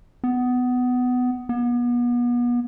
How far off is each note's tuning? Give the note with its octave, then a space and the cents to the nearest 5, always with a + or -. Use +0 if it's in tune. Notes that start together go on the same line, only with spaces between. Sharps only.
B3 +15
B3 -35